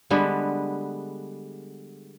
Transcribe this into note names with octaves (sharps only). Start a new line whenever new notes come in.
D3 G3 G#3 B3